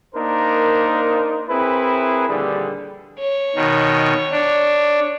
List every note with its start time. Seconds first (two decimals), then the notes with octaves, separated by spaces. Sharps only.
0.15 A#3 D4 D#4 A#4 C5
1.48 C4 E4 G#4 A#4 B4
2.28 A#1 D#2 D3 G3 G#4
3.20 C#5
3.56 B2 D#3
4.32 D4